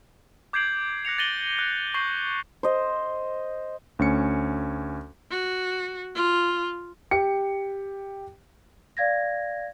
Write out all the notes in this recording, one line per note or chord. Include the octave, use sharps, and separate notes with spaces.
D6 G6 G#6 C7 D7 F#7
F#6 A#6 C#7 F7
A6 A#6 D#7 F#7 G7
F#6
C#6 G6 C7 F#7
C5 D#5
D2 C#4 C#7
F#4
F4
G4 C#7
D5 F5 G#6 A#6